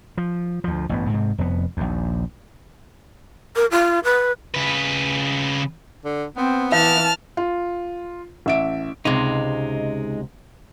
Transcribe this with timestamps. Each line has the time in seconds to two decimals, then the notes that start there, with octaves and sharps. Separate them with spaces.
0.18 F3
0.64 D2 F3
0.89 A1 G2 B3
1.09 G#2 C3
1.38 F1 F2 B3
1.77 A#1 D#2
3.56 A#4
3.71 F4
4.04 B4
4.54 C#3 B4
6.05 D3
6.37 B3 C4
6.72 E3 F5 A5 F6
7.37 F4
8.46 A1 E5 D7
9.05 C#2 C3 G#3 D#4